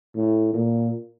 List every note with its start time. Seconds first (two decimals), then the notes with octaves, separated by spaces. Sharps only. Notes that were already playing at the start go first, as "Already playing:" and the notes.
0.16 A2
0.54 A#2